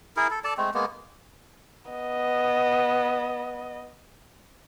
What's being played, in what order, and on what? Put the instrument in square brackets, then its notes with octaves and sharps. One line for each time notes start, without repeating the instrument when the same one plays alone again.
[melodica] E4 G#4 A#4
A4
A4 D5 A5
G#3 A3 C4
G#3 A#3 B3
[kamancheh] B3 D#5